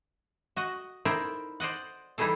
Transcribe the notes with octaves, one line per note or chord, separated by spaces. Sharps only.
F#4 D#5 F#5
D#4 E4 A#4 C5 D5 E5
C5 D5 D#5 F#5
E3 G3 D#4 E4 G#4 A4